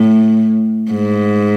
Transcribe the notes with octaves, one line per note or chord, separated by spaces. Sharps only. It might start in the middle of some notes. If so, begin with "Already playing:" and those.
Already playing: A2
G#2